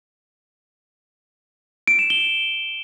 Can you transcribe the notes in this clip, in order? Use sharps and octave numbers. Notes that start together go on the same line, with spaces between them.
D7
E7
G7